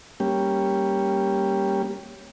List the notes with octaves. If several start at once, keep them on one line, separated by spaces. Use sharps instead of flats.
G3 A#3 C#4 G4